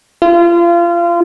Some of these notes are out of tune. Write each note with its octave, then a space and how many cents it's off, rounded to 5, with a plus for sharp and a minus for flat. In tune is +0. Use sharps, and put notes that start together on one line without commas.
F4 -30